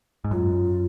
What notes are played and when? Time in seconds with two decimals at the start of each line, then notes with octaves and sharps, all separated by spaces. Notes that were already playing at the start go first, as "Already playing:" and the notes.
0.24 G#2
0.31 F#2 F4